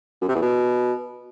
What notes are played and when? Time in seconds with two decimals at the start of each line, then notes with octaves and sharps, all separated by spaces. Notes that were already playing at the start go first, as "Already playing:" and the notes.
0.21 F#2
0.28 C3
0.35 E2
0.42 B2